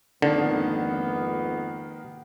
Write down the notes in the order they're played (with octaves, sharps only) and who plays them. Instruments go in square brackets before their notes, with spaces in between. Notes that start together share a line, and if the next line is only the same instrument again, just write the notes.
[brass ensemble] G#1 F2 B3 [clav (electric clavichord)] D3 [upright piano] D#3 A#3